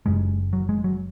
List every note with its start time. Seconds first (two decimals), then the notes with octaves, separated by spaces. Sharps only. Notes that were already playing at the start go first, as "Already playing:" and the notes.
0.06 F#1 F#2 C#3 G#3
0.53 F#3
0.69 G#3
0.84 F#3